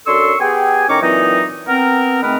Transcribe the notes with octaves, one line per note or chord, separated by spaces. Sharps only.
F#2 D4 A4 C6 C#6 E6
B3 G4 G#4 G5 G#5
A2 D#3 C#4 A#5 C#6 D6
A#2 E3 F#3 C4 D#4
B3 C4 A#4
D#3 G#3 A3 C4 A#4 B4